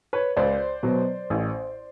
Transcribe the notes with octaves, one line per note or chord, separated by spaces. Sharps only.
B4 C#5
C#2 C5 D5
B2 F#3
A1